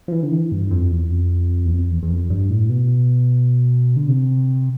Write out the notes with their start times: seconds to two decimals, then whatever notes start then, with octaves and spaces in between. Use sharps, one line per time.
0.08 F3
0.12 E3
0.23 D3
0.32 E3
0.52 G2
0.71 F2
0.91 E2
1.11 F2
1.66 E2
1.71 F2
1.90 E2
2.03 E2
2.10 F2
2.30 G2
2.50 A2
2.69 B2
3.96 D3
4.08 C3